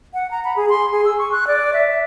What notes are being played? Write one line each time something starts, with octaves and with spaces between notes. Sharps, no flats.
F#5
A#5
B5
G#4
C6
G#4
E6
C#6
F#6
D5
E5
E5